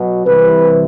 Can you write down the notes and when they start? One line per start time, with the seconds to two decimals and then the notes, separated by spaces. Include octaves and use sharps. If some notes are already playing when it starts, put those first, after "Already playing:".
Already playing: B2 F#3
0.25 C2 C3 E3 B4